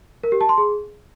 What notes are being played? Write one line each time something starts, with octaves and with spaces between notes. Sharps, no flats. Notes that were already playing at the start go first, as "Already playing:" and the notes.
A#4
G4
A5
C6
G#4